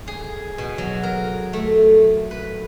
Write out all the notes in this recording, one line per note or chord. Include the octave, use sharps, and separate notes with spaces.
G#4
B2
F#3
A#4
A3
B4